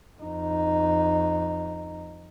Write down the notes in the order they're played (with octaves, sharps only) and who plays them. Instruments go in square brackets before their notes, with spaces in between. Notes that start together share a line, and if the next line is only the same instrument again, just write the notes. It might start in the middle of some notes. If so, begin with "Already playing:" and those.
[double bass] F2 D#4